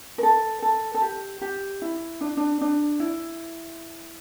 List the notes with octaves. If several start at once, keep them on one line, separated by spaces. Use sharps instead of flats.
A#4
A4
A4
A4
G4
G4
E4
D4
D4
D4
E4